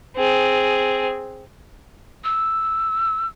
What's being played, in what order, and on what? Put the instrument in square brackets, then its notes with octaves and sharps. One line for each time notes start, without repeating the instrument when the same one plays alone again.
[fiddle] C4 G#4
[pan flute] E6